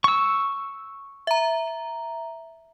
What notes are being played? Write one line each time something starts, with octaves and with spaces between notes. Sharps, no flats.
C#6 E6
E5 A#5